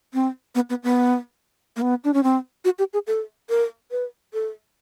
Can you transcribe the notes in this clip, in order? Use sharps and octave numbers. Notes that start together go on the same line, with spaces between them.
C4
B3
B3
B3
A#3
B3
D4
C#4
C4
F#4
G4
G#4
A4
A#4
B4
A4